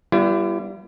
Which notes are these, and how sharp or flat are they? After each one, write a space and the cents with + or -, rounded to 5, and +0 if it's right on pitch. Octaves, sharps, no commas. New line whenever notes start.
G3 -10 B3 -30 E4 +40